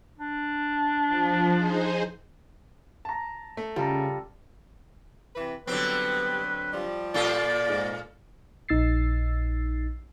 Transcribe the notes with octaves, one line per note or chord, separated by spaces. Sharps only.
D4
F3
D#4 G#4 C5
A5 A#5
A3
C#3 G3 F4 A4 A#5
C3 E3 B4
D3 F#3 G3 B3 C4 B4
F3 G3
A#2 F4 A4 D5
G#2
A#1 D#4 E6 A6 C7